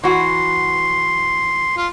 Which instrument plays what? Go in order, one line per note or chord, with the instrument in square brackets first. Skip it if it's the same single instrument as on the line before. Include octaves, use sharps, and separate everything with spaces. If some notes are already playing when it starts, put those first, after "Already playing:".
[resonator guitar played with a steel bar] E3 F#4 [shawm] C6
[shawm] F4